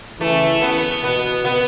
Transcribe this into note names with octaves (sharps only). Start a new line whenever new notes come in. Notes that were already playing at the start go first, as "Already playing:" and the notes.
C#3 E3 A3
B3
B2 B3
B3